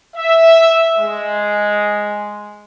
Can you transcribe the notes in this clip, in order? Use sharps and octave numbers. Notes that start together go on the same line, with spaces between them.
E5
G#3